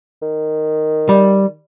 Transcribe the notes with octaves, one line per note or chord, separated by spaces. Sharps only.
D#3
G3